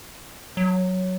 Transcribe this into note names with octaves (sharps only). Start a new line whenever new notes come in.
F#3